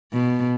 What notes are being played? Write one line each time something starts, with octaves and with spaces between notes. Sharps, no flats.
B2